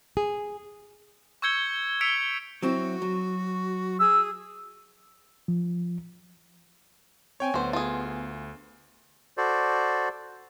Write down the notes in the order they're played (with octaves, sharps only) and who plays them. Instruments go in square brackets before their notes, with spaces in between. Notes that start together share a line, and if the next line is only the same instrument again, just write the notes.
[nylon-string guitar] G#4
[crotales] C#6 E6 G6 G#6 C#7 G7
E6 B6 C#7 D7 F7
[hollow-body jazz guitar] F#3 C4 E4 [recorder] F#4
[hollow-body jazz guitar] F#3
[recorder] G#4 [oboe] E6
[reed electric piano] F3
[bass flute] C4 [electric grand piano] C#5 G5 G#5
[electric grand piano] D2 [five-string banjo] F#3 C5 [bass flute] B3
[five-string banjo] F4 G#4
[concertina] F#4 A4 C5 D5